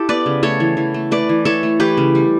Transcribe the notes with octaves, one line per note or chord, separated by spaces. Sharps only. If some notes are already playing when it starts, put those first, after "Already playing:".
Already playing: E4 G4 A4
B3 B4 D5
C#3
A3 A4 C#5
E3
E3
A3
A3 B4 D5
E3
E3 A4 C#5
A3
E3 G4 B4
C#3
G3